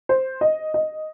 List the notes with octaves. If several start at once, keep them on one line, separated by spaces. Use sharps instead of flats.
C5
D#5
D#5